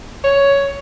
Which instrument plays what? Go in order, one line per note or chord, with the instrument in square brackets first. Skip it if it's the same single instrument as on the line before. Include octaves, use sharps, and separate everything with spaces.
[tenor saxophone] C#5